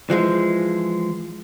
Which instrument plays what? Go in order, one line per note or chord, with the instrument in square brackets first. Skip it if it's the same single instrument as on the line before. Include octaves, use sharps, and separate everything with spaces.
[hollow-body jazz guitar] E3 F3 G#3